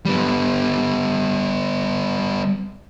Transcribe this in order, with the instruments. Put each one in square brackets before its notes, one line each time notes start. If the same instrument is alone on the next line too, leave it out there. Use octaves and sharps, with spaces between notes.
[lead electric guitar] G3 B3